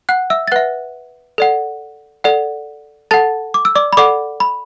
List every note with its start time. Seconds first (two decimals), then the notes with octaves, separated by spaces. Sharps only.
0.09 F#5 F#6
0.30 E5 E6
0.48 A6
0.52 B4 E5 F#5 F#6
1.38 A4 D5 F#5
2.24 A4 D5 F#5
3.11 A4 F#5 A5 A6
3.54 D6
3.65 E6
3.75 D5 D6
3.93 B5
3.97 A4 D5 F#5 D6
4.40 B5